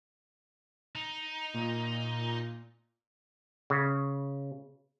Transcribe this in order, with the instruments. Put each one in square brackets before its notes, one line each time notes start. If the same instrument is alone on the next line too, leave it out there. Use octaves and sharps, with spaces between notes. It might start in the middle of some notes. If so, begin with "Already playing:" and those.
[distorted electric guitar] D#4
[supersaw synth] A#2
[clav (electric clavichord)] C#3